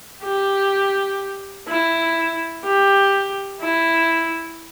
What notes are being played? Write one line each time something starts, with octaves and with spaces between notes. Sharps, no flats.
G4
E4
G4
E4